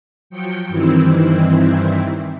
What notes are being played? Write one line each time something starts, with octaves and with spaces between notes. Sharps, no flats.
F3 F#3 G5 C#7
G2 D#3 E3 C4 E4